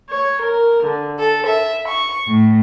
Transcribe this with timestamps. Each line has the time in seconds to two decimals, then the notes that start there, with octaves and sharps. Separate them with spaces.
0.10 C#5
0.43 A#4
0.84 D3
1.19 A4
1.47 E5
1.87 C#6
2.26 A2